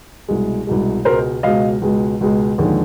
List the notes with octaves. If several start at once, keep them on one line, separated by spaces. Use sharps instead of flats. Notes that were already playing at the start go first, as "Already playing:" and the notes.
C2 B2 G#3
C2 B2 G#3
C#2 B2 G#3 A#4 C5
C#2 B2 G#3 D#5 F5
C#2 B2 G#3
C#2 B2 G#3
D#2 D3 F3 G#3